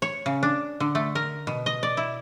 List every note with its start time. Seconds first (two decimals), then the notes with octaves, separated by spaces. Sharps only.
0.02 C#5
0.26 C#3
0.43 D4
0.80 D3
0.95 A3
1.15 A#4
1.47 B2
1.66 D#5
1.83 D5
1.97 E4